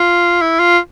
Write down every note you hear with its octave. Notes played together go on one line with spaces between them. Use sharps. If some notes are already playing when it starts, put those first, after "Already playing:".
Already playing: F4
E4
F4